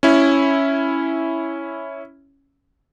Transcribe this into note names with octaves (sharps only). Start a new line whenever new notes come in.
C#4 E4